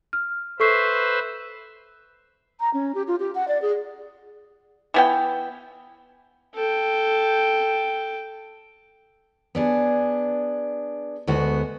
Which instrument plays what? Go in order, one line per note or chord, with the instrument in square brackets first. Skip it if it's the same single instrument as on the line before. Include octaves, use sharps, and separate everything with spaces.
[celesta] F6
[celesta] A4 C#6 C7 [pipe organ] B4 C5 E5
[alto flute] A#5
C#4
G4
F4
G4
F#5
D5
G#4
[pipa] E3 B3 G5
[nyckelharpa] A4 G5
[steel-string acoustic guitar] B3 D4 G#4
D2 G#3 B3 F#4